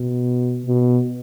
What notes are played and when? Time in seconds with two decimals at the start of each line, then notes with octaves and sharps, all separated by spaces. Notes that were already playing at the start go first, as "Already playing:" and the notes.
Already playing: B2
0.66 B2